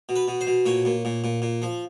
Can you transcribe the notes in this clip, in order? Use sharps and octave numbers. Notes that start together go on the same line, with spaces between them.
B2
B4
B2
C5
B2
A#2 C#5
A#2
A#2
A#2
A#2
F3